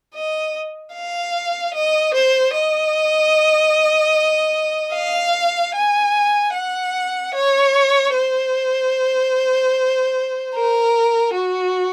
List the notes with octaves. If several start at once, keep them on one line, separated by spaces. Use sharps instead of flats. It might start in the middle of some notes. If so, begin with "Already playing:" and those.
D#5
F5
D#5
C5
D#5
F5
G#5
F#5
C#5
C5
A#4
F#4